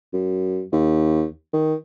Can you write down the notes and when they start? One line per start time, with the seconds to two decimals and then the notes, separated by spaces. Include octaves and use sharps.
0.13 F#2
0.72 D#2
1.53 D#3